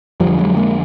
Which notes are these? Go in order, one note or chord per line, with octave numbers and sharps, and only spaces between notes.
F2 D3 F3 G3
F#3 G#3
G#3 A#3